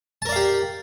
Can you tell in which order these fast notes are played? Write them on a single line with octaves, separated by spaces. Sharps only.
A5 A#4 D5 F5 G4